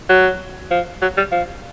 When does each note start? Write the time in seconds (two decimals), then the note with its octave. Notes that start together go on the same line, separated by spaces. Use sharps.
0.10 F#3
0.71 F3
1.02 F#3
1.17 G3
1.32 F3